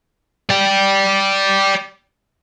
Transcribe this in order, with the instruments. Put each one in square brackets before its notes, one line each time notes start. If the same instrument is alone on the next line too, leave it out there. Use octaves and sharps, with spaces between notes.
[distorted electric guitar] D5 G5